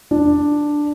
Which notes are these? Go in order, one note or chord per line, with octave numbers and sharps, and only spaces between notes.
D4